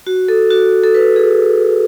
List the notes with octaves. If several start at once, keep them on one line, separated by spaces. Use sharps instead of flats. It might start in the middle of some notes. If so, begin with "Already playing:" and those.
F#4
A4
F#4
A4
B4
G#4